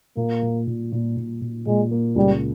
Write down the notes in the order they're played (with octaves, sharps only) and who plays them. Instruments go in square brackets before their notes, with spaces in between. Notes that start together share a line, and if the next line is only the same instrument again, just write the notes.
[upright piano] A#2 [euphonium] A#3
[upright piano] A#2
A#2
A#2
A#2
A#2
[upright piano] A#2 [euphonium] G#3
[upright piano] A#3
[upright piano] C#2 [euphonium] G3